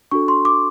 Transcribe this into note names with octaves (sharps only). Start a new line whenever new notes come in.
D4 F#4 A4 C#6
C6
D6